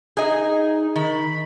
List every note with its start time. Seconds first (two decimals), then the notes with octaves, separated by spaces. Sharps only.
0.17 D#4 G#4 D#5
0.96 D#3 B5